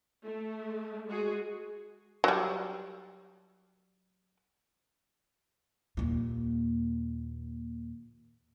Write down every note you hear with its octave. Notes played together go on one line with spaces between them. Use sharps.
A3
G#3 F#4 G#4
F#3 G3
D#2 A#2